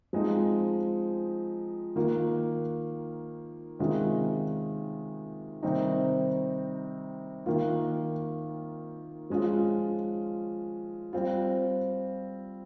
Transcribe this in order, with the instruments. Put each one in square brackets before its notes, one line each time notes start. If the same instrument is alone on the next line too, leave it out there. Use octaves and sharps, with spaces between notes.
[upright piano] F3 G#3 C4 D#4
D#3 A#3 F4
C3 D#3 G#3 C#4 F4
C3 D#3 G3 C4 D#4
D#3 A#3 F4
F3 G#3 C#4 F4
G3 C4 F4